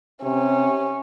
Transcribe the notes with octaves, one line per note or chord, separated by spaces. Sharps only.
C3 C#4